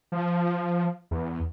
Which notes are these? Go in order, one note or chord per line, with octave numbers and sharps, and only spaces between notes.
F3
E2